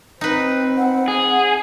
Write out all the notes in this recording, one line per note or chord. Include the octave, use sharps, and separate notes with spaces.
C4 D#4 B4
F#5
G#4